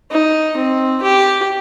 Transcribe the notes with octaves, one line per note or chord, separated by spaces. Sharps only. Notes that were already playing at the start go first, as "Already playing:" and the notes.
D#4
C4
G4